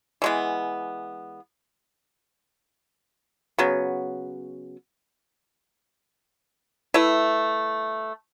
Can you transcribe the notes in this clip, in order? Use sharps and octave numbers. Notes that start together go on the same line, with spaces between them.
E3 G#3 B3
C#3 F#3 B3
A3 E4 B4